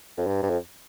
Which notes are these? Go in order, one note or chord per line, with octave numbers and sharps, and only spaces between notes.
F2
G2
G2
F2